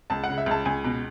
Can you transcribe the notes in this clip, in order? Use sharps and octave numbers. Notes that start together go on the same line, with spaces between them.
C#2 A5
F#5
C#3
E5
C#2 A5
C#2 G#5
B2